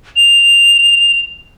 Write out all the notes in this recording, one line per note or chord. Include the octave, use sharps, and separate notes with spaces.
F7